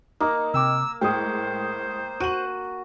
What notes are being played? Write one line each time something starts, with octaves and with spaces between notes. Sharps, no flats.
A#3 D#4 D#5
C3 G5 D6 E6
A2 G#3 C5 G5 D#6
F#4 D#7 F#7